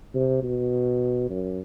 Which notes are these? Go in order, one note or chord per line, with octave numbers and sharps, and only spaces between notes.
C3
B2
F#2